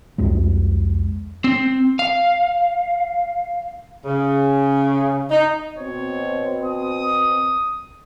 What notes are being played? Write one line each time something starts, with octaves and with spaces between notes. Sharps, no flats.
C2 F2 G#3
C4
F5
C#3
D#4
B2 C4 C#5
D#6